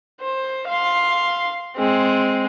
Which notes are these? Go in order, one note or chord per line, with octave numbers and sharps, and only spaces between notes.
C5
F5 C6
G#3 C4